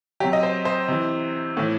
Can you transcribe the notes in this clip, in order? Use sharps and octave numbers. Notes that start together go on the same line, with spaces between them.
C3 F#3 G4
D#5
C5
C5
C3 E3
A2 E3